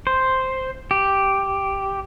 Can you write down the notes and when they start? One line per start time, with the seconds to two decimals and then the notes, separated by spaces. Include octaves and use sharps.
0.07 C5
0.91 G4